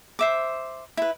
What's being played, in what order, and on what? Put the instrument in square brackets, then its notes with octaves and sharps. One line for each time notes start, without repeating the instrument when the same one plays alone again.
[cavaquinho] C5 E5 D6
E4 B4